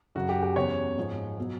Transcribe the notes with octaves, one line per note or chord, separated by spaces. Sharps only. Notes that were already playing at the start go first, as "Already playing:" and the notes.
F#2 C#3 F#3 F#4
G4
G4
E2 C#3 F#3 C#5
G#2 F3 G#3
B2 F#3